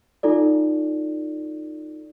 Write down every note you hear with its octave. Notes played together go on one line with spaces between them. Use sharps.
D#4 F4 A4 D5